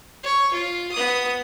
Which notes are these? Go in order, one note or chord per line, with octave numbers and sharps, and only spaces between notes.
C#5
F4
B3 D#6